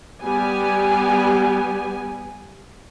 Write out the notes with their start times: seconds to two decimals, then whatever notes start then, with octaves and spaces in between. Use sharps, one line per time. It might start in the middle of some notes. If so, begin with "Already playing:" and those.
0.22 G3 B3 G4 G#5